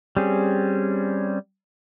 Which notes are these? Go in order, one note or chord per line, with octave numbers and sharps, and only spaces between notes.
G3 C4 C#4 G#4